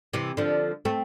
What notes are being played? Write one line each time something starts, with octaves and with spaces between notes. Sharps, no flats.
C3 E3
D3 F3
A3 C4